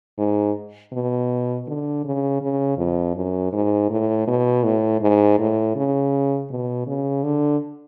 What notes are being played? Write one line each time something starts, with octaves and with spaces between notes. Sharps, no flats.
G#2
B2
D3
C#3
C#3
F2
F#2
G#2
A2
B2
A2
G#2
A2
C#3
B2
C#3
D3